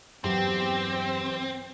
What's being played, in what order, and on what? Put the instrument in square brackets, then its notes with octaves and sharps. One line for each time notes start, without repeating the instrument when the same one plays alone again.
[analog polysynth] E2 G4 E7 [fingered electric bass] G2 F#3 [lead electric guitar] C4